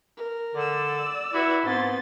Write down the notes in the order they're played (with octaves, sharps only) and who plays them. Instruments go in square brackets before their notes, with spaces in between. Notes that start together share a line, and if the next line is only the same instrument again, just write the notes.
[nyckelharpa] A#4
[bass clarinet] D3 [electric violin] D5 E6
[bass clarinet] E4 [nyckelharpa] F#4 B4
[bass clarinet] G#2 [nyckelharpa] B3 C4 [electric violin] C6 A6